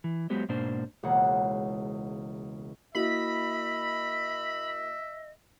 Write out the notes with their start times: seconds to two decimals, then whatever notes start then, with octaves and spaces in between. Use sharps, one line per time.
0.04 E3
0.30 F#3 G#3 B3 G4 C5
0.49 G#2 B2 A#3 D4 C5
1.03 E1 C#2 A#3 F#5
2.95 A#3 E4 F#4 D#5 E5 B5